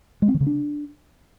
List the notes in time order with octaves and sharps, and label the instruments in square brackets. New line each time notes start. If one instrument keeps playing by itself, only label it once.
[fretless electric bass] G#3
C4
D#3
C#3
D4